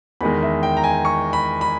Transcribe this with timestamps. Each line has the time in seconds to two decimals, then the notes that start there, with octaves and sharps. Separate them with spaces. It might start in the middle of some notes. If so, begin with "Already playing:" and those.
0.21 E2 D#3 G#3 B5
0.43 E5
0.63 G5
0.77 A#5
0.84 G#5
1.05 C#6
1.33 B5
1.61 B5